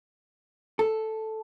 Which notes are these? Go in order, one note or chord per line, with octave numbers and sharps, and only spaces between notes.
A4